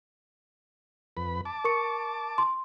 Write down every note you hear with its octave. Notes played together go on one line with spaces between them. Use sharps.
F2 B4 B5
A5 D6
A#4 C#6 C#7
C6